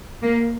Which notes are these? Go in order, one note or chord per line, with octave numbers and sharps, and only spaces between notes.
A#3